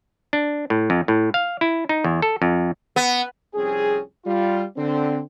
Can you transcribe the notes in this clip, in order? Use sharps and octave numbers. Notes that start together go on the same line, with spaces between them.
D4
A2
F2
A2
F5
E4
D#4
E2
A4
F2
B3
C2 F2 C4 C#4 G#4
G3 F4
D3 C4